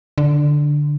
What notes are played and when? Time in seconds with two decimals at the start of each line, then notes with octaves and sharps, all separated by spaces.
0.18 D3